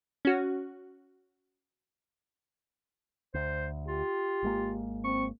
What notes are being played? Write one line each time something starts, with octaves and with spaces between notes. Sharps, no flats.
C#4 F#4
D2 C5
F4 G4
G#1 G#3 A#3
C4 C#6